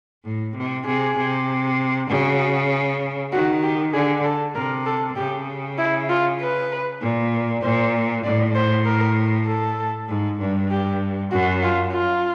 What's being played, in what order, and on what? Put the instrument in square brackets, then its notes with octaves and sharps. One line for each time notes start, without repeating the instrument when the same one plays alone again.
[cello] A2
C3
[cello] C3 [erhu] G#4
[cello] C3
[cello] C#3 [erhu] F#4
[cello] D#3 [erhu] F#4
[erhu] G4
[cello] D3 [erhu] G#4
[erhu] A4
[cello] C3 [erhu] A#4
[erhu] A4
[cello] C#3 [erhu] G4
[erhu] E4
F4
B4
[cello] A#2
[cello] A#2 [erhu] C5
[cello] A2 [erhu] D5
[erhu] C5
A#4
A4
[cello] G#2
G2
[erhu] G4
[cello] F#2 [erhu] F#4
[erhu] F4
F4